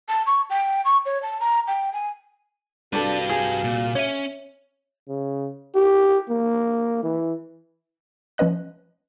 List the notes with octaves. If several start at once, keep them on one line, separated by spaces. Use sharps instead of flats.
A5
C#6
G5
C#6
C#5
A5
A#5
G5
G#5
C2 D4 F#4 G4 A4 B4 F5
G#4
A#2
C#4 C#5 E5 D#7
C#3
G4
A#3
E3
F3 C#4 B4 D#5 F#6